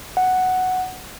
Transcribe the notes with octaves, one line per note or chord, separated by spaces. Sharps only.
F#5